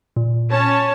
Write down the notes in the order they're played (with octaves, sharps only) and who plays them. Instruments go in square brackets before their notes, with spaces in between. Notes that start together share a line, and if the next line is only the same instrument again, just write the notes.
[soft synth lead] A#2
[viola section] C#4 C#5 A5